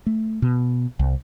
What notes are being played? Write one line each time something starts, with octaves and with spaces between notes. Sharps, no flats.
A3
B2
C2